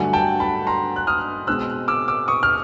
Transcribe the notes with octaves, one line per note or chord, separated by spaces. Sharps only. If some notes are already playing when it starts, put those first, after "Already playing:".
Already playing: G2 D3 F#3 A3 F#5 G#5
G5 A5
A5 B5
A#5 C6
F#6
D#6 F6
B2 G#3 C4 E6 F#6
D6 E6
D6 E6
C#6 D#6
F6